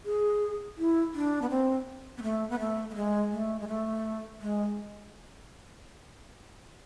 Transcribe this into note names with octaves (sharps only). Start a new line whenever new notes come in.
G#4
E4
D4
B3
C4
B3
A3
B3
A3
A3
G#3
A3
G#3
A3
G#3